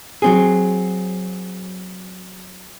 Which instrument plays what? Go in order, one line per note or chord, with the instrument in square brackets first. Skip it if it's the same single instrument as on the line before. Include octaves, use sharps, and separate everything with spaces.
[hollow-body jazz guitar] F#3 C4 G#4